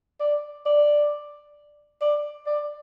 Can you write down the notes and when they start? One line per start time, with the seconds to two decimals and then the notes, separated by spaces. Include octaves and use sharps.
0.20 D5
0.66 D5
2.01 D5
2.46 D5